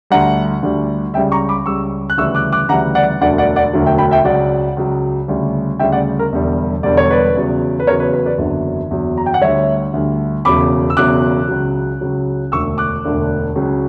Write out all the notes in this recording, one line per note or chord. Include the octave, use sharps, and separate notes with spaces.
D2 D3 G3 F#5 A#5
D2 D3 G3
C#2 C#3 G3 E5 G5
A#5 C#6
B5 D6
C#2 C#3 G3 C#6 E6
F#6
D2 C#3 E3 G3 C#6 E6
D6 F#6
D6 F#6
D2 C#3 E3 G3 F#5 A#5
D5 F#5
E1 D2 D3 F#3 D5 F#5
D5 F#5
D5 F#5
E1 D2 D3 F#3
E5 G5
G5 B5
E5 G5
C#2 C#3 F#3 D5 F#5
C#2 C#3 F#3
D2 C#3 G3
D2 C#3 G3 E5 G5
D5 F#5
A#4
E1 E2 D3 G3
E1 E2 D3 G3 D5
C#5
B4 D5
E2 C#3 F#3
B4
E2 C#3 F#3 A#4 C#5
B4
B4
B4 D5
F#1 E2 D3 F#3
F#1 E2 D3 F#3
A#5
G5
F#5
D2 D3 G3 C#5 E5
D2 D3 G3
E1 E2 C#3 F#3 B5 D6
E6
E1 E2 C#3 F#3 D6 F#6
C#2 C#3 F#3
C#2 C#3 F#3
E1 D2 D3 C#6 E6
D6 F#6
E1 D2 D3
C#2 C#3 F#3